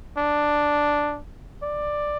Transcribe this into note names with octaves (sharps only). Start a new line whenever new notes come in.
D4
D5